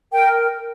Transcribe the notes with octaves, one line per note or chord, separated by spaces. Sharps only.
A#4 G5